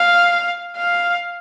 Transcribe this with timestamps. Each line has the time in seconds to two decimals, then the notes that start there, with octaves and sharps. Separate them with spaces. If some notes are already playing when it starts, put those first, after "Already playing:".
Already playing: F5
0.77 F5